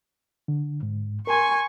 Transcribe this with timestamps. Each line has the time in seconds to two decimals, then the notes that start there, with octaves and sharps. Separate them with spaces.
0.48 D3
0.83 G#2
1.27 A#4 G#5 C6 C#6